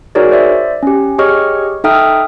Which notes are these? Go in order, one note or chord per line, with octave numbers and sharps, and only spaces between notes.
D#4 F#4 G#4 A#4 C#5 D5
C5 D5 E5
C#4 G4
G4 G#4 C#5 D#5 C#6 F6
D#4 A4 E5 G5 D#6 F6